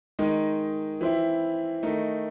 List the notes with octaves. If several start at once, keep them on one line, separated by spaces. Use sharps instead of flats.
D#3 G#3 D#4
E3 C4 E4
D#3 A3 D#4